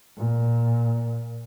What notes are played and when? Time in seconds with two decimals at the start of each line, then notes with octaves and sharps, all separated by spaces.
0.17 A#2